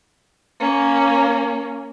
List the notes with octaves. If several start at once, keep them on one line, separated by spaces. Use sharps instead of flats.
A#3 C#4